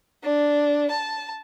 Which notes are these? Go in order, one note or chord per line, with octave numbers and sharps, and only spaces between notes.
D4
A5